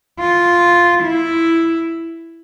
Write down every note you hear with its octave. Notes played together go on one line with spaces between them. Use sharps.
F4
E4